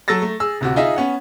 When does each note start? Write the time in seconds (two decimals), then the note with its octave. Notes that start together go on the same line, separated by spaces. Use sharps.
0.08 F#3 A4 E6 A6 A#6
0.22 A3
0.40 G#4 E6
0.61 D1 C3 F#4
0.76 D#4 F4 G#4 D#5 E5
0.96 B3 C#4 F#5